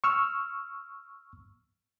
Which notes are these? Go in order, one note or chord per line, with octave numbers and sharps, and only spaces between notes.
C#6 E6 F6